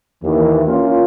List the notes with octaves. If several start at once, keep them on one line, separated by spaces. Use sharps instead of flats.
D#2 E3
A#3 C#4 F4